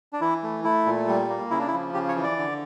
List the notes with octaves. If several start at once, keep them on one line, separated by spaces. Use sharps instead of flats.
D4
E3 E4
A3
A3 E4
A#2
G3
A#3
C#3 E4
D4
E4
F3
C#3 G4
C#5
E3
D5
D3